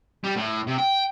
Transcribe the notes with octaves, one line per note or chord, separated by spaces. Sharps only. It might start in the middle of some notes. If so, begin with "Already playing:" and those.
G3
A2
C3
G5